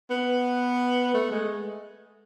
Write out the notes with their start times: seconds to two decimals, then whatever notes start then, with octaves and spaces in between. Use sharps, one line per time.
0.10 B3
1.14 A3
1.32 G#3